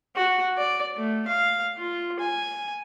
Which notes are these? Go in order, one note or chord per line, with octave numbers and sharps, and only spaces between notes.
F#4
D5
A3
F5
F4
G#5